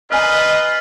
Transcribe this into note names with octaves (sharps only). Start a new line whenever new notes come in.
F4 B4 D5 D#5 G#5 A#5 F6